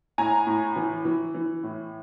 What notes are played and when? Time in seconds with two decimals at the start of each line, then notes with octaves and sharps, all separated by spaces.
0.18 A2 G#5 A#5
0.47 A2
0.76 E3
1.05 E3
1.34 E3
1.63 A2